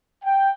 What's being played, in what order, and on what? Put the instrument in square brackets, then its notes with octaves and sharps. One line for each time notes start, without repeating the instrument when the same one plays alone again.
[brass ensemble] G5